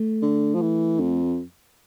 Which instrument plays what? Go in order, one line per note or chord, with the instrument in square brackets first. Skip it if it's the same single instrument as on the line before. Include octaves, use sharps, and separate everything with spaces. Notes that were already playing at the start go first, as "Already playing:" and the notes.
Already playing: [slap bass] A3
[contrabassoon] D3
F3
E3
F2